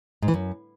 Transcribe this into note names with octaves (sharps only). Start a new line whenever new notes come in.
G#2
E3
F#2